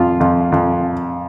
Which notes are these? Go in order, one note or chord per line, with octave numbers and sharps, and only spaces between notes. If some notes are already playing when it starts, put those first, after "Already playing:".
Already playing: F2 F4
F2
F2